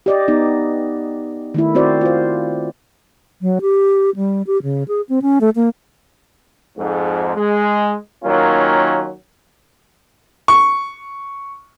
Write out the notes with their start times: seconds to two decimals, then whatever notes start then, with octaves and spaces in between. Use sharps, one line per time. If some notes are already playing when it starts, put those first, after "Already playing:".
0.06 G4 D5 D#5
0.28 B3 D#4
1.54 D#3 A3 E4
1.75 C4 F#4 C5 D5
2.01 F4 C5
3.42 F#3
3.62 G4
4.16 G3
4.47 G4
4.63 C#3
4.88 G#4
5.09 C4
5.22 C#4
5.41 A3
5.56 A#3
6.77 F2 G#2
7.36 G#3
8.24 D#3 F#3 A#3 C#4 F4
10.48 C#6